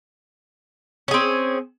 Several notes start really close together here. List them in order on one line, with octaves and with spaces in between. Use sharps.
C#4 G#4 C4